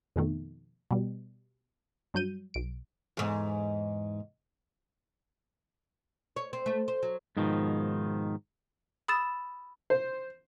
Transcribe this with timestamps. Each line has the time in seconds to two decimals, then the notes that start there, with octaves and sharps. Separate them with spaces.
0.16 F2 B2 D#3 A3
0.91 B2 G3
2.14 G2 F#3 G6 D#7
2.54 B1 D7
3.17 E2 G#2
6.36 C#5
6.53 C4
6.66 A3
6.88 C5
7.03 F#3
7.37 G#2 B2 D#3 F3
9.08 B5 D#6 E6 A6 E7
9.90 C5